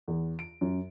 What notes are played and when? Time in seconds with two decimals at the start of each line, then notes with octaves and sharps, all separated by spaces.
0.08 E2
0.39 D7
0.61 F#2